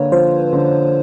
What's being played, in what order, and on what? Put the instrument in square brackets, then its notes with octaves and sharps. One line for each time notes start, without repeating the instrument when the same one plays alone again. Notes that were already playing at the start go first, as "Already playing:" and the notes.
Already playing: [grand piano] D3 A#3 [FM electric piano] B4 C#5
[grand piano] F3 [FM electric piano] C5
[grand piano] D3